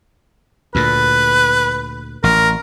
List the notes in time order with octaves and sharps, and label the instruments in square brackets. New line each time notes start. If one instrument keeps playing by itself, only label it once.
[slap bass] D2 A#2 [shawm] B4
[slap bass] A1 [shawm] A#4